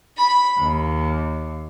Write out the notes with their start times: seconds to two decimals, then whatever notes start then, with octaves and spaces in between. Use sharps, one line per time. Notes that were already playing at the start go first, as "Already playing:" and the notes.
0.18 B5
0.58 D#2